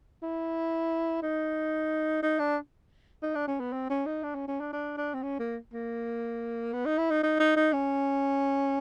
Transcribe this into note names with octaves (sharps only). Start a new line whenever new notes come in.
E4
D#4
D#4
D4
D#4
D4
C#4
B3
C4
C#4
D#4
D4
C#4
C#4
D4
D4
D4
C4
C#4
A#3
A#3
B3
D#4
E4
D#4
D#4
D#4
D#4
C#4